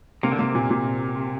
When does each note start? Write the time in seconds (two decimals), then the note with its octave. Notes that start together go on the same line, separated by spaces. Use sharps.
0.23 C3 A#3
0.32 D3
0.39 C3 A#3
0.55 A#2
0.70 A#2